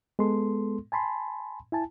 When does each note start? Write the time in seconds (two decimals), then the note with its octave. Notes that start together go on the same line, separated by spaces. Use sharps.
0.19 G#3 B3 A4 C6
0.92 G#5 A5 B5 C6
1.72 E4 G#5 A5